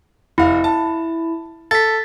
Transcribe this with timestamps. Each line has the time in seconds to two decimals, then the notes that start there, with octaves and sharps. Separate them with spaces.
0.38 F1 E4 F5
0.64 A5
1.71 A4 A6 B6